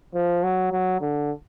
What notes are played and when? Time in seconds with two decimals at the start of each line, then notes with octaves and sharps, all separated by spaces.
0.15 F3
0.43 F#3
0.72 F#3
1.01 D3